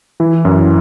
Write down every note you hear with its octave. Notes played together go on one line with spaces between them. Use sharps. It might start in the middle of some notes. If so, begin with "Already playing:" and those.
E3 E4
F#2